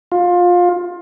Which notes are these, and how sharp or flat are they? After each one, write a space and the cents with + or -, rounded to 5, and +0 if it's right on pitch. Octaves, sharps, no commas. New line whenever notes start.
F4 +20